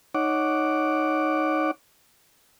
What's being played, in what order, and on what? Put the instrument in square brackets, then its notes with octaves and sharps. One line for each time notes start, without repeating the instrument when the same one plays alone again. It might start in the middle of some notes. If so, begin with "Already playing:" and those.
[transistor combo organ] D#4 C#5 F#5 D6